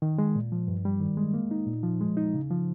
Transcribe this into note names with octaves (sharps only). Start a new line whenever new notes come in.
D#3
G#3
A#2
F3
G2
G3
D#3
G#3
A#3
D#4
A#2
F3
G#3
D#4
C#3
F3